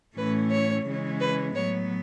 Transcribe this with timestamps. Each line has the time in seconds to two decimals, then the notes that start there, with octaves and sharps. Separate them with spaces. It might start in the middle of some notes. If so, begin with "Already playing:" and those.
0.17 A2 E3 A3 C#4 B4
0.51 C#5
0.86 C#3 E3 G#3 C#4
1.20 B4
1.54 A2 F#3 B3 C#5